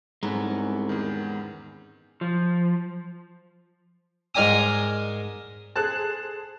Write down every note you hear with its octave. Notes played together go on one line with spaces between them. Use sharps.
C2 G#2 G#3 B3 C#4 A4 A#5
E2 D#3
F3
G#2 G#3 A#4 D5 G#5 D#6
G#4 A4 C5 A5 F#6